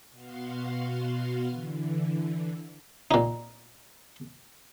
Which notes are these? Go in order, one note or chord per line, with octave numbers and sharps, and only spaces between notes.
B2 B3 F#4 F5 C6
D3 E3
A#2 D#4